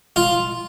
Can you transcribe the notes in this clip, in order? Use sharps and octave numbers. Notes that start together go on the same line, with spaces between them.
F4